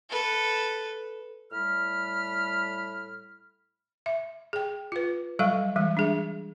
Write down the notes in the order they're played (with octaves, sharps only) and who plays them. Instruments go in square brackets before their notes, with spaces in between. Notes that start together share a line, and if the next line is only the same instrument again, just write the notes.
[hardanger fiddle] A4 B4
[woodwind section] A2 G3 B5 F6
[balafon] E5
G#4 G5
F4 B4
F#3 G3 A4 F5 C#6
E3 G3 G#3
D4 G#4 E5